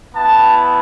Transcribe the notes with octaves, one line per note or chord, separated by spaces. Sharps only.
B3 E4 A5